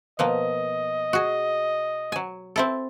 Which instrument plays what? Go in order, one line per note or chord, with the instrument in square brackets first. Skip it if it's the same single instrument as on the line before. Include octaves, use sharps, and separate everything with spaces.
[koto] B2 F3 A#3 [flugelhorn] D#5
[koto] F#4 G#4
F#3 G#5
C4 E4 A4